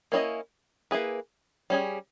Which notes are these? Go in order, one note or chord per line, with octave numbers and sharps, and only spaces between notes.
A#3 C#4 E4 G#4 D#5
A#3 E4 G#4 B4
G3 C#4 G#4